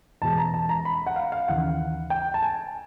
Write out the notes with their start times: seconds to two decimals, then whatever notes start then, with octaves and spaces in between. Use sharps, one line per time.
0.22 E2 B2 G#3 A5
0.38 A#5
0.54 A5
0.69 A#5
0.85 B5
1.06 F#5
1.16 F5
1.32 F5
1.48 D#2 C#3 E3 F#5
2.10 G5
2.34 A5
2.43 G#5